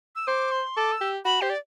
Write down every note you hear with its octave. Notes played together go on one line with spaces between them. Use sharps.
E6
C5 D6
C6
A4 D6
E6
G4
F#4 B5
G4 C5
D5